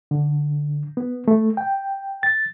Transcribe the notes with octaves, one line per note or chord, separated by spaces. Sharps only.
D3
B3
A3
G5
A6